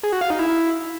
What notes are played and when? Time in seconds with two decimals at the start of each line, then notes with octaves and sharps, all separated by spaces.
0.03 G#4
0.12 F#4
0.21 F5
0.30 D#4
0.39 E4